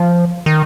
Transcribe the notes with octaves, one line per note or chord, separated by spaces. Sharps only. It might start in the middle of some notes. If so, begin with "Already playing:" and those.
Already playing: F3
D#3